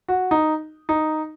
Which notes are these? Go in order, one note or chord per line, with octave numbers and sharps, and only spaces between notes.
F#4
D#4
D#4